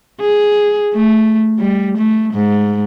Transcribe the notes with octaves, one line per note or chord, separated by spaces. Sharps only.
G#4
A3
G3
A3
G#2